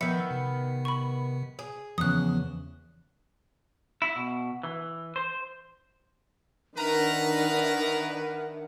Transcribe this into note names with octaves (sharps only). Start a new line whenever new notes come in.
D#3 F3 B3 E5 E6 G6 C#7
C3
B5 C#6
G#4
E2 C#3 F3 B3 D#6 F#6
E4
B2
E3
C5
D#3 D4 A#4 B4 E5 F#5 A#5